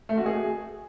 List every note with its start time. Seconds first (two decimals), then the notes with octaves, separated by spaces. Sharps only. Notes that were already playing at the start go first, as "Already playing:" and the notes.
0.09 A3
0.17 F#4
0.26 G#4